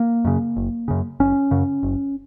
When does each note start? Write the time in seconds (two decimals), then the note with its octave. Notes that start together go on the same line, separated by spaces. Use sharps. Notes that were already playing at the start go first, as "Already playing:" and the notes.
Already playing: A#3
0.25 F#2 C#3
0.56 F#1
0.88 F#2 C#3
1.20 F#1 C#4
1.51 F#2 C#3
1.83 F#1